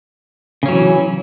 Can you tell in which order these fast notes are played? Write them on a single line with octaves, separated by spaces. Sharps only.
C#3 C#4 F#3 E3